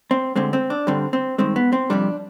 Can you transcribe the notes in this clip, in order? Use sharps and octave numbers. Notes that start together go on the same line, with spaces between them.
C4
D2 D3 G#3 C4
C4
D4
G2 D3 G3 C4
C4
G2 D#3 G#3 C4
B3
C4
F2 C3 G3 D4